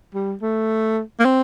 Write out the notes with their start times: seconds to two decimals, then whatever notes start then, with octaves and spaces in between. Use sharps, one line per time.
0.14 G3
0.42 A3
1.20 A#3
1.25 C4